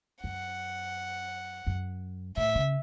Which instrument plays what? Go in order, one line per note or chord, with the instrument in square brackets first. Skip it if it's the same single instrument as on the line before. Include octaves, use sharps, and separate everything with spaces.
[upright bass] F#2 [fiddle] F#5
[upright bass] F#2
[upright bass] A2 [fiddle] E5
[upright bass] C#3